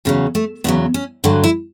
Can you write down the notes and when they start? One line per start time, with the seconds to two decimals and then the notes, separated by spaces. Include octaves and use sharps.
0.05 E2 C#3 F#3 C#4
0.35 A3
0.64 E2 C#3 F#3 B3
0.94 C#4
1.24 G2 D3 F#3 F#4
1.44 E4